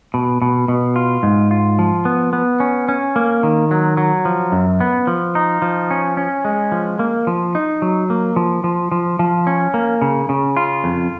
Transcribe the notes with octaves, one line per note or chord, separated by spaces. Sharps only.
B2
B2
B2
F4
G#2
F4
F3
B3
B3
C#4
C#4
A#3
D#3
F#3
F#3
F3
F#2
B3
F3
D#4
F3
C#4
C#4
G#3
F3
A#3
F3
D#4
F#3
A#3
F3
F3
F3
F3
C#4
A#3
C#3
C#3
F4
F2